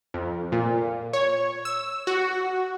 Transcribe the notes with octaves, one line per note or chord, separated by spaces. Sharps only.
F2
A#2
C#5
E6
F#4